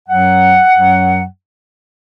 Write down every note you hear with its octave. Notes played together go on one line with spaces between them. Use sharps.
F#2 F#3 F#5
F#2 F#3